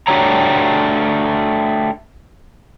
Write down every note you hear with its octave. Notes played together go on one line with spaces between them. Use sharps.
A3 D4 F#4 G4 C#5 A#5